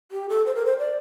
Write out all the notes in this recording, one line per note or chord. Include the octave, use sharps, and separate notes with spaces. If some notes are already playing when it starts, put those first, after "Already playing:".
G4
A4
C5
A#4
C5
D5